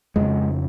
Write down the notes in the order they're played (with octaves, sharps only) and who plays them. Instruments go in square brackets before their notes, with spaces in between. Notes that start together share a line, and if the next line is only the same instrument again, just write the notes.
[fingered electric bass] F2 C#3 G#3